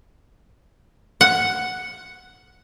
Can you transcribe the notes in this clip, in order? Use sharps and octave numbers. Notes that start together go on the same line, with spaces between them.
F#5